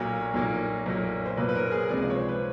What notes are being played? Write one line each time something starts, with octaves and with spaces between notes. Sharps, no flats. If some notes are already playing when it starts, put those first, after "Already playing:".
Already playing: B1 A#2 F#3 A#3 C#5
B1 A#2 F#3 A#3
B1 A#2 F#3 A#3
C5
B1 A#2 F#3 A#3 B4
B4
A#4
G#4
C#2 C3 F3 G#3 D5
D5
C#5
C5
B4